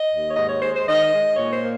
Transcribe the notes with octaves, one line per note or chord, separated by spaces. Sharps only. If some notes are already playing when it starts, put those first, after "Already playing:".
Already playing: D#5
D#2
C#5
G#2 D#5
C#5
G#3 C5
C5
D#3 D#5
G#3
A#2 C#5
C5
A#3